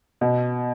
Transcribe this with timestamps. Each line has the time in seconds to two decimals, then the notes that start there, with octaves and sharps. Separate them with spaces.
0.21 B2